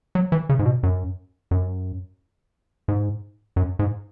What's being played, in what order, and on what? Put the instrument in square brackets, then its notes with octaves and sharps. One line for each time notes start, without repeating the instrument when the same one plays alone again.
[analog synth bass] F#3
E3
C#3
G#2
B2
F#2
F#2
G#2
F#2
G#2